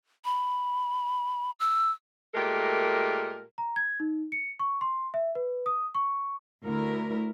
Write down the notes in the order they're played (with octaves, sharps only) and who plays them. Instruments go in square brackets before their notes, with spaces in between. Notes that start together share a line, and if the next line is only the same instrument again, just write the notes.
[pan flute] B5
E6
[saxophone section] A#2 G#3 A3 G4 A4 A#4
[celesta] A#5
G#6
D#4
C#7
C#6
C6
E5
B4
D#6
C#6
[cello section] D2 E4 A#4